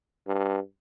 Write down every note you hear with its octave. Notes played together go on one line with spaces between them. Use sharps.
G2